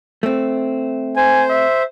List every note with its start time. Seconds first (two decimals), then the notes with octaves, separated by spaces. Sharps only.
0.23 A3 C4
1.17 C5 G#5
1.50 E5